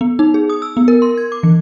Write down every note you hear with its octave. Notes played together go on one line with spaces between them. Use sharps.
B3
D#4
G#4
D#6
E6
B3
A#4
C6
G#6
D6
E3